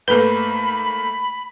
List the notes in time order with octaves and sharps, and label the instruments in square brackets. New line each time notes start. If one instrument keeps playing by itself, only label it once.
[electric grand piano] G#2 A3 A#3 [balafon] A4 B4 [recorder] B5